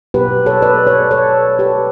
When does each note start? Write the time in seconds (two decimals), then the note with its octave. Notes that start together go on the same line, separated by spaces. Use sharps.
0.14 B2 F#3 B3 G4 B4
0.46 A4 C#5
0.62 B4 D5
0.87 A4 C#5
1.11 A4 C#5
1.59 G4 B4